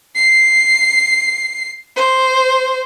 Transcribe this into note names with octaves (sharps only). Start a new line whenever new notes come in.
C7
C5